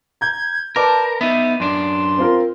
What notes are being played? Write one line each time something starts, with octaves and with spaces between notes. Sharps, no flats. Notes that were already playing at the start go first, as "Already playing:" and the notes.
A#5 G6 G#6
A#4 B4 D5 A5 D6
B3 D#4 E5
F#2 D4 C6
C4 F4 A#4